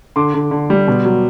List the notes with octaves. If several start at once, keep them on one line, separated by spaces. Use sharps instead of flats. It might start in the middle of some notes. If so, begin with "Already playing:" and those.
D3 C6 D6
D3
D3
G3
B2
F#3